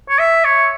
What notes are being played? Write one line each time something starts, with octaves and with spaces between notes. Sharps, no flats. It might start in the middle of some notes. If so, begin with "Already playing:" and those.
C#5
E5
C#5